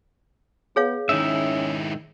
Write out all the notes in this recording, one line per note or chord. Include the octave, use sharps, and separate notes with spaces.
B3 G#4 C#5 F5
G#2 D#3 C#4 D#4 E4 E5